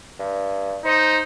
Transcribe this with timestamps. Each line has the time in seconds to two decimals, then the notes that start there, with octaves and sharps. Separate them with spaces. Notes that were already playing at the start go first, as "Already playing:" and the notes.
0.20 G2
0.85 D#4 C5